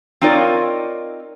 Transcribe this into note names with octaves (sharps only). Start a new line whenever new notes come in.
C4 D#4 F4 A#4 C#5 D5